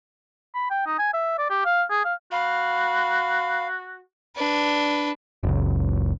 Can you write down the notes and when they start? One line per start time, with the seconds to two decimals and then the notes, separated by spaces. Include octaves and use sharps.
0.55 B5
0.71 G5
0.86 D#4
0.99 G#5
1.14 E5
1.38 D5
1.50 G4
1.65 F5
1.91 G#4
2.05 F5
2.32 F#4 F5 B5
4.36 D4 B4
5.43 F#1 C#2